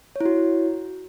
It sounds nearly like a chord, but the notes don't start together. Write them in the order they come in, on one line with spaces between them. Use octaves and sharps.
C#5 E4 F#4